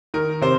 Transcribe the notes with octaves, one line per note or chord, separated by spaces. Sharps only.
D#3 A#4
C3 C5